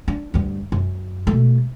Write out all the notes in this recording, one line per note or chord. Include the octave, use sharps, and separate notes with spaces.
D4
D2 G2
F#2
B2 A3